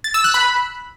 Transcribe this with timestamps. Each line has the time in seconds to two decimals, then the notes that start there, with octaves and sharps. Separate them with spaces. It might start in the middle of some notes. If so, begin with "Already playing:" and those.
0.04 A6
0.14 E6
0.24 F#6
0.34 B5